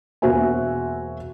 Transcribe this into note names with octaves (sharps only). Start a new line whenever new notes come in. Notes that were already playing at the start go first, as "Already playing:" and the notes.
E1 A#3 F#4 C5 E5 G#5